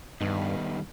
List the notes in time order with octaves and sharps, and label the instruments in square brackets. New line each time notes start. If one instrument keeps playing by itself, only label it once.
[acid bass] G2 [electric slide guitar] D#3 G3 B3 D#4